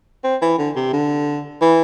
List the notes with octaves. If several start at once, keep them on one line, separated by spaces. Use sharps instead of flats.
C4
E3
D3
C3
D3
E3